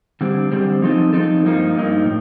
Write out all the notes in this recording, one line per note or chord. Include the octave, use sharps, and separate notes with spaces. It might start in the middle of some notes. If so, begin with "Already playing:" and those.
D3 G3 C4
D3 G3 C4
F3 C4 D#4 A4
F3 C4 D#4 A4
G2 F3 A#3 D#4
G2 F3 A#3 D#4
A2